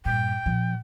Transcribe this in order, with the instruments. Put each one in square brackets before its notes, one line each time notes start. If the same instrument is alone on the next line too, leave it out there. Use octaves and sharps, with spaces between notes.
[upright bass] G2 A#2 [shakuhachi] G5
[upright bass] A#2 F3